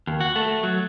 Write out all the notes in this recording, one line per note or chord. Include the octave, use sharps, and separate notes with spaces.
D#2
F#4
A3
F#3